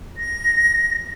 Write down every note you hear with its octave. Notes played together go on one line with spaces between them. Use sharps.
A#6